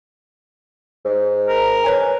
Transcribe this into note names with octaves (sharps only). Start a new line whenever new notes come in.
G#2
A#4
B4 C#5 G#5